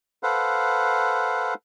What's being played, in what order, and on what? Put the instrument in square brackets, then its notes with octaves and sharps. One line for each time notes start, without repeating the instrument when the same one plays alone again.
[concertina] A4 B4 C5 F5 F#5